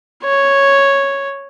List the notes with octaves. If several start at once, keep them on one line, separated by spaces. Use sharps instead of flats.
C#5